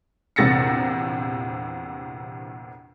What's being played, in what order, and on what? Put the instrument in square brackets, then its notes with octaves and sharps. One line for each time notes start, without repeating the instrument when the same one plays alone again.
[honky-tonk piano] A#1 E2 C3 A6 A#6 C#7